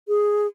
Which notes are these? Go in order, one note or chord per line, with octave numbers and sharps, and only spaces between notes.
G#4